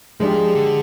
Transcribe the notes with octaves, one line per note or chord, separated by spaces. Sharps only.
F3 G#3 D4 G4
D3